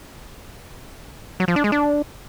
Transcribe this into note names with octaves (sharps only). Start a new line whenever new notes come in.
F#3
F3
D4
G#3
D4